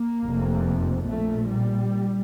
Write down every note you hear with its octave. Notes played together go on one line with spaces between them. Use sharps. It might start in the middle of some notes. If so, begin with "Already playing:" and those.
Already playing: A#3
F1 F2 C3
A#1 A#2 A3
G3